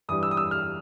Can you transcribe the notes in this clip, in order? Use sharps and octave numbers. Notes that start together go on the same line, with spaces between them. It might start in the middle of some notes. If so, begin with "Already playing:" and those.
G2 E3 G3 D#6
E6
D#6
E6
F6